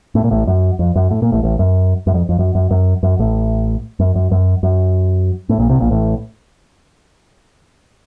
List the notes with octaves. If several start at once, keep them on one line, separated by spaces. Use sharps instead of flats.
A2
A#2
A1 A2
F#2
F2
F#2
A2
A#2
A1 A2
A1 A2
F#2
F#2
F2
F2
F#2
F#2
F#2
F#2
A1 A2
F#2
F#2
F#2
F#2
A2
A#1 A#2
C2 C3
A#1 A#2
A1 A2